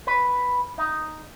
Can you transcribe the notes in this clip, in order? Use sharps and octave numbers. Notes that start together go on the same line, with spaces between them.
B4
D#4